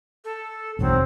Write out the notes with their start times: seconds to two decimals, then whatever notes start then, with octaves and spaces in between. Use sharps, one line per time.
0.25 A4
0.79 E1 B1 F#2 F#3 C4